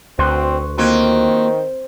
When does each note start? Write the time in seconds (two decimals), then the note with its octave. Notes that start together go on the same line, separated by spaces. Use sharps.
0.19 D2 C4 F#4 B4 C6
0.78 D#3 A#3 C4 F4 F#4